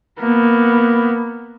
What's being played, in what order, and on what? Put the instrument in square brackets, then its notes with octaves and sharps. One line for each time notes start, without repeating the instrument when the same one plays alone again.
[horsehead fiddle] A#3 B3